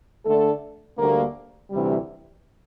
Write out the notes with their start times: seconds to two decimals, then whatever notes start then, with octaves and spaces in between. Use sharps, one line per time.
0.26 D3 A3 D4 A4
0.98 D2 D3 G3 A#3
1.72 D2 C3 E3 G3